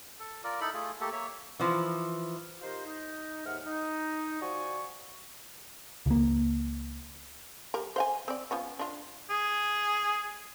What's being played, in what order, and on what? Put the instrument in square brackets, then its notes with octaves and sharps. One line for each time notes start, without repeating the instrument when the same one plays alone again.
[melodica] A4
F4 A#4 D5
D#4 E4 A4 B5
A3 F4 G#4
A3 A#3 G4 A4
A#3 C#5 E5
[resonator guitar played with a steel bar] E3 F3
[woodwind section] D#4 F4 G4 A#4 C5
D#4
D#2 G#2 E5 F#5 F6
D#4
F3 F#4 D5 G#5 C#6
[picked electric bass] C#2 A#3
[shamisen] G3 A#4
C5 F5 G#5
C4 D5
F3 B3 C#4
D4 F4
[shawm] G#4